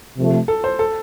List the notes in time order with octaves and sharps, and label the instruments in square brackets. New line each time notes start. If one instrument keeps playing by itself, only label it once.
[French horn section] C3 F3 A3
[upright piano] A4
C5
A4